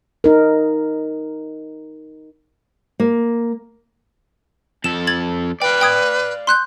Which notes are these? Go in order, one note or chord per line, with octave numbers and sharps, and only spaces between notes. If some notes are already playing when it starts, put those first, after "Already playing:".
D#4 A#4
A#3
F2 A4 E7
G#6 A6 F#7
B4 D5 F5 G5
G5 D#6 G#6
C6 F#6 G6